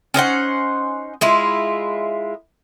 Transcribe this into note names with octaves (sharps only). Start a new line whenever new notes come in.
C#4 D#4 C5 F#5
G#3 E4 F4